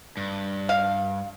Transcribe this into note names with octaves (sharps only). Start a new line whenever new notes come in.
G2
F5